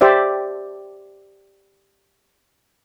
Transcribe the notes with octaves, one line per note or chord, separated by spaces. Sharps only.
G4 C5 D5 E5